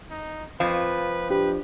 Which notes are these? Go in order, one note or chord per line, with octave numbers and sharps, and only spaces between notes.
D#4
F2 F3 B4
D4 G4 B4